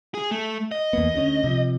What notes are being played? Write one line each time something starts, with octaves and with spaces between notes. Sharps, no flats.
G#4
A3
D#5
E2 A#3 B3
D2 C#4
C3 F3